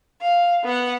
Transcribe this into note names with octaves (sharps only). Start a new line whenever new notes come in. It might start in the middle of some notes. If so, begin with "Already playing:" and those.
F5
B3 F#5